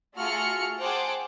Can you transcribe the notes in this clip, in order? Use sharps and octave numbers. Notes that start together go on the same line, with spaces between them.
A3 F4 F#4 G#4 F6 C#7
G#4 C5 F#5 G5 A5 D6